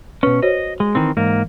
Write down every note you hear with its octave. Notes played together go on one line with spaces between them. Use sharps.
B2 C#4 B4
F#4 C5 C#5 D#5
G#3
D#3 E3 C4
G#2 E3 A#3